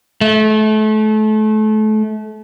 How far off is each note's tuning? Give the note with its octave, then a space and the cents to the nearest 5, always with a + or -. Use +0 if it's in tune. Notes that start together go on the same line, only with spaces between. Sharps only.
A3 -30